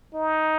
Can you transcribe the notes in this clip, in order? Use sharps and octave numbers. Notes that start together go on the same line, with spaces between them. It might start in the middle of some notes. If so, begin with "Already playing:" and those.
D#4